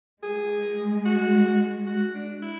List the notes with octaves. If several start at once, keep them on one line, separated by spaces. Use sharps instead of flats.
G#3 G#4
F#4
F#4
D4
E4